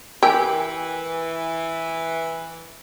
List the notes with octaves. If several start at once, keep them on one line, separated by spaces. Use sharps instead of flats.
E3 G4 A#4 G#5